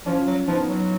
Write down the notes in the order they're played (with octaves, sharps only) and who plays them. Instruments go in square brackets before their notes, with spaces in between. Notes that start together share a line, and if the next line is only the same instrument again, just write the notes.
[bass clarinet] F3 [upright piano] C#4 F4
[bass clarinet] F#3
[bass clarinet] F3 [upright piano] B3 D#4
[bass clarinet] F#3